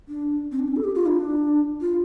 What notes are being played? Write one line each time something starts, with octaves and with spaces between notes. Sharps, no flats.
D4
C4
D4
C4
A4
G4
F4
D4
F4